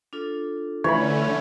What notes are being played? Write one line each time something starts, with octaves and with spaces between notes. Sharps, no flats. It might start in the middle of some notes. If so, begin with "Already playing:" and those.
D4 F4 A4
D3 E3 A3 C#4 C#5 B5